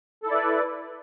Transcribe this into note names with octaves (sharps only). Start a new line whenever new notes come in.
E4 A4 B4 D5